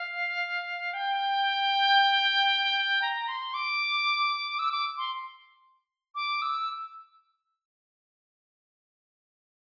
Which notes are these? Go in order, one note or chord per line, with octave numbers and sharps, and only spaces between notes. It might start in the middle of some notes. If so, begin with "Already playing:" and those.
Already playing: F5
G5
A#5
C6
D6
E6
D6
C6
D6
E6